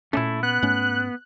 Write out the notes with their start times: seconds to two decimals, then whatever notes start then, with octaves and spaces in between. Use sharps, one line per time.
0.13 A#2 A3 C#4 D4 E4
0.43 B3 F#6
0.62 G#2 A3 C#4